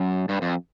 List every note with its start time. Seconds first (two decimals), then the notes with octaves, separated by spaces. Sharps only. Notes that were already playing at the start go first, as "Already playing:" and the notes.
Already playing: F#2
0.29 G2
0.42 F2